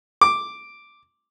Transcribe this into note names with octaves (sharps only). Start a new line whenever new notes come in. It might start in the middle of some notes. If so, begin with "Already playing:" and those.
D6